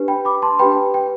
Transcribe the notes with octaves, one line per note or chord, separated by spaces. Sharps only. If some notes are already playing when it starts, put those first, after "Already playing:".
Already playing: D4 G4 B4
G5 B5
B5 D6
A5 C6
D4 G4 B4 G5 B5
G5